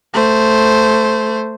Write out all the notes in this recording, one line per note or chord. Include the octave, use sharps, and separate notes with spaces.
A3 C5